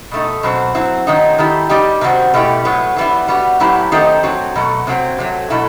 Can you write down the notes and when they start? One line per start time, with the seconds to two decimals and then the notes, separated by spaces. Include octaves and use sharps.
0.11 B2 A3 D#4
0.43 B2 F#3 C4
0.75 F#3 C4 E4
1.07 D#3 F#3 A3 C4 D#4
1.38 D#3 A3 E4 G4
1.69 G3 D#4 G4
2.01 C3 D#3 G3 C4 F#4
2.34 B2 A3 E4 G4
2.65 A2 F#3 B3
2.96 E3 G3 B3 E4
3.28 G3 B3 F#4
3.60 A2 F#3 B3 E4 G4
3.92 D#3 A3 C4 D#4 G4
4.23 F#3 C4 F#4
4.55 B2 F#3 A3
4.87 C3 F#3 C4 F#4
5.18 C3 F#3 A3
5.50 B2 F#3 A3 E4